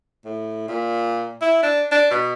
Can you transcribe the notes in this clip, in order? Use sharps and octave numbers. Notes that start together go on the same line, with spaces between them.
A2
A#2
E4
D4
D4
B2